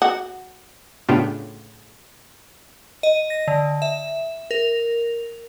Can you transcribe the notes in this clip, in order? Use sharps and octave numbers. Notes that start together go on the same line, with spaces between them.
F#4
A2 C#3 B3 D4 F4 G4
D#5
A#6
D3
E5
A#4